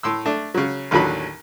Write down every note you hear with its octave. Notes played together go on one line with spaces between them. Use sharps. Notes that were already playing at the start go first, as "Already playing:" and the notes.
A2 C6 E6
A3 D4
C#3 F#3
A1 D#2 A2 D3 F#3 B5